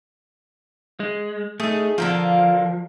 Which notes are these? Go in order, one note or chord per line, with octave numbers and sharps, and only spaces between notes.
G#3
A3 D#4 G#4
D3 F3 A#3 F4